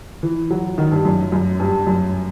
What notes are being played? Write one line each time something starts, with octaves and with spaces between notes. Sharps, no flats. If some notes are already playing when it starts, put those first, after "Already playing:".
E3
F#3
D#3
G2
F#2
F#2
G2
F#2